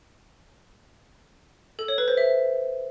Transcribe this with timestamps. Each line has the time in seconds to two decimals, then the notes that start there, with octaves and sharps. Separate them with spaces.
1.79 A4
1.88 C#5
1.98 B4
2.08 C5
2.17 E5